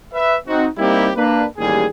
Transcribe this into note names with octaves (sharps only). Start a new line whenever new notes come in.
B4 E5
C4 D#4 F#4
G3 A#3 C4 D#4 E4 G4
A#3 D4 B4
A1 D#2 G3 G#4